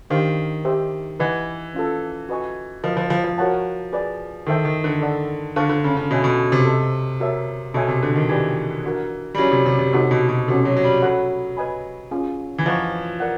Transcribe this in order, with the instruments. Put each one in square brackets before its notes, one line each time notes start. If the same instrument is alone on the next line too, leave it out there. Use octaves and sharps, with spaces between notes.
[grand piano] D#3 [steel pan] D4 G4 C5 F5
[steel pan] D#4 G4 C5 E5
[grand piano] E3 [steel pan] B4 D#5 F#5 B5
[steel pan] C#4 F4 A4
F#4 B4 D#5 G#5 C#6
[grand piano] F3 [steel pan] F#4 A#4 D#5
[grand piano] F3
F3
F3
[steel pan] F#4 A#4 C#5 F#5 A5
G#4 B4 D5 G5
[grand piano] D#3 [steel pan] E4 A4 C5 E5 G5
[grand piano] D#3
D3
[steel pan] A4 D5 F#5
[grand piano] D3 [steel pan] C5 F5 A5 C#6
[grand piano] D3
C#3
C#3
[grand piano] B2 [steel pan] A4 C#5 E5 G#5
[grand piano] B2
C3
[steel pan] A4 C5 D#5
F#4 A#4 C#5 E5 A5
[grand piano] B2 [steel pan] A4 C#5 E5 G#5 C6
[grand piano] C3
D3
D#3
[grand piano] E3 [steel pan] G4 B4 D5 G5
[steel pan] D4 F#4 A#4
[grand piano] G3
[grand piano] F#3 [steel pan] C#4 E4 G#4
[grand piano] C3
C3
C3
[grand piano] C3 [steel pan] D#4 F#4 A4 C#5
[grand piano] B2
B2
[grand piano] C3 [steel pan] C#4 F#4 A4
[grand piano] F#3
F#3
G3
[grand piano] F#3 [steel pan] A4 C#5 F#5 B5
[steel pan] B4 D#5 G#5 B5
C#4 F4 G#4
[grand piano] E3
[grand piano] F3 [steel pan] B4 D#5 F#5 A#5 C#6
[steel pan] A#4 D5 F#5